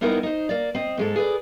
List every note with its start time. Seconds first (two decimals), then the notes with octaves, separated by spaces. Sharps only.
0.01 G3 B3 C4 D#4 E4 A#4
0.23 D#4 C5
0.49 A#3 D5
0.75 C4 D#5
0.97 G#2 G#3 A4
1.16 G#4 B4 D5